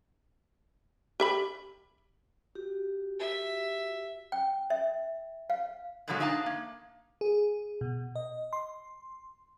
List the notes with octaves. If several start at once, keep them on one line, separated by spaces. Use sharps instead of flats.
G4 E5 B5
F#4 G4
E5
G5
E5
F5
G#2 B2 D3 F3 F#3 G#3
D4 D#4 F5 A5
A#3
G#4
B2
D#5
C6